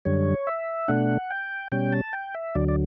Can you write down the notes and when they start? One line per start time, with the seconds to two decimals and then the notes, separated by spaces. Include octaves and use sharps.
0.05 F#2 D3 G3 C#5
0.47 E5
0.88 B2 A3 D4 F#5
1.30 G5
1.72 B2 G3 C#4 G5
1.93 A5
2.13 G5
2.34 E5
2.55 D2 D3 F#3 D5
2.68 D5